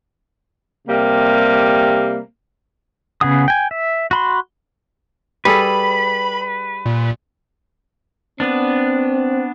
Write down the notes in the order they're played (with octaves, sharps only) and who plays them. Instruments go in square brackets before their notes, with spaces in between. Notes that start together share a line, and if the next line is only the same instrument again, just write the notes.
[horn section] C3 G3 A#3
[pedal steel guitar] C#3 B3 G#4 F#5 D#6
G5 G#5
E5
F#4 B5 C6
[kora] G3 G#4 A4 [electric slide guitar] B4 [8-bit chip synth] B5
[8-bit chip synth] A#2
[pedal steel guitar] B3 D4 [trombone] C4